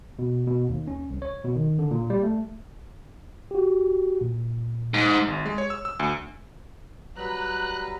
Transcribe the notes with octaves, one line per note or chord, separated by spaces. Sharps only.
B2
B2
D#2
C#4
C2
C#5
B2
D#3
D3
A#2
G3
A3
F#4 G4
A#2
G#2
G#1
G#3
C#5
E6
E6
D2
F#3 G3 B4 A#5 F#6